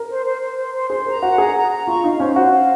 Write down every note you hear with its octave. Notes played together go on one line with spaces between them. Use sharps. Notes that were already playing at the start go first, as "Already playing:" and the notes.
Already playing: A#4
C5
C5
C5
C5
C5
G#4 C5
A#4 A#5
F#4 F#5
G#4 A#5
A#5
A#5
F4 C#6
D#4 F5
C#4 C5
F#4 C5
F5